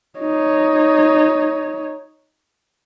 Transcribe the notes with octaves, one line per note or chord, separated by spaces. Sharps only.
D#4 C#5